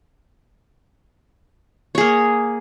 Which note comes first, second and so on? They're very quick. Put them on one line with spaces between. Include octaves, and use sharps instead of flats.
C#5 G#4 A#3